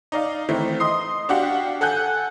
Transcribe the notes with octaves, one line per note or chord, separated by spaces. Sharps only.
D#4 D5 F5
D#3 E3 A3 C4
D#5 C6 D#6 C7
D4 F#4 G4 F5 F#5
A4 F#5 G#5 F#6 G6